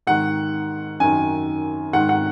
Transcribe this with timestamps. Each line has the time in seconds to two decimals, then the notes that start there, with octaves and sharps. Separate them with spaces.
0.07 G#2 D#3 F#5
1.00 F#2 D#3 G#5
1.93 G#2 D#3 F#5
2.09 F#5